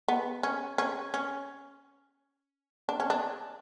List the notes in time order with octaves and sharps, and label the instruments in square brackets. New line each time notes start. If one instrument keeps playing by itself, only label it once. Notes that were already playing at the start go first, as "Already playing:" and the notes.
[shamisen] B3
C#4
C#4
C#4
D4
C#4
D4